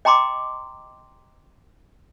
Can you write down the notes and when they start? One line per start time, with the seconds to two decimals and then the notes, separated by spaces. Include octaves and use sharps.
0.05 D#5 G5 A#5 C6 D6